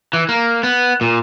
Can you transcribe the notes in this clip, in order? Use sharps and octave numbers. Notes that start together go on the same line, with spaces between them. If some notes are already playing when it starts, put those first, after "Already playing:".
E3
A#3
B3
A#2